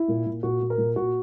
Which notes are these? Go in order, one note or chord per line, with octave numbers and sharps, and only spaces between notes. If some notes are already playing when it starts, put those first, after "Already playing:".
Already playing: E4
A#2
A#2
A#2 F#4
A#2
A#4
A#2
A#2 F#4